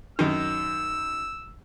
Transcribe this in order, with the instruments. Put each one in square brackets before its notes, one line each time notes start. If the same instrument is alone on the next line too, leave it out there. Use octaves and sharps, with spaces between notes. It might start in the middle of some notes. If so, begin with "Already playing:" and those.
[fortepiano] F#2 D#3 [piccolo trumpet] E6